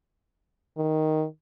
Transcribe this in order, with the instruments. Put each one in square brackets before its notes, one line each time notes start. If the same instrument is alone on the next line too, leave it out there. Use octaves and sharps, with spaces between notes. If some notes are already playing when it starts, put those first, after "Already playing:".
[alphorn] D#3